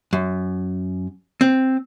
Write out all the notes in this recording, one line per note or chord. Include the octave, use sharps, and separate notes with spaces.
F#2
C4